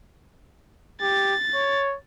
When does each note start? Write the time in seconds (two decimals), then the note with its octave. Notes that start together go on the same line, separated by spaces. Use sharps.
1.02 G4 A6
1.55 C#5